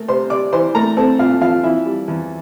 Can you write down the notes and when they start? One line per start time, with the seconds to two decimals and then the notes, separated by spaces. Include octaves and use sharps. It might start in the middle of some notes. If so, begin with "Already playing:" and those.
Already playing: A3 A#4
0.08 C3 C5 C6
0.30 C3 D5 D6
0.53 E3 C5 C6
0.75 A3 A#4 A#5
0.97 C4 A4 A5
1.19 A#2 F4 F5
1.41 F3 F4 F5
1.63 E3 E4 E5
1.86 G3
2.08 E2